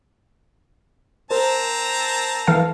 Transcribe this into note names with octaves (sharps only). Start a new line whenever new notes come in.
C4 A#4 C5 A5 A#5
E3 A4 F5